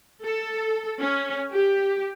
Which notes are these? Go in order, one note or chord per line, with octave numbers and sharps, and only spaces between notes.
A4
C#4
G4